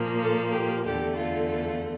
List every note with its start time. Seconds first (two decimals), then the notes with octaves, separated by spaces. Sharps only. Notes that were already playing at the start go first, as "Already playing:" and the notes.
Already playing: A#2 F3 A#3
0.22 A4
0.53 G4
0.85 E2 D3 A3 G4
1.17 F4
1.49 F4